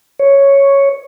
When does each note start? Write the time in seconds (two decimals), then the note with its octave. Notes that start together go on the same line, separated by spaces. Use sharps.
0.19 C#5